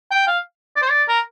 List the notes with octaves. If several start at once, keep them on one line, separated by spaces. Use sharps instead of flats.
G5
F5
D5
C5
D5
A#4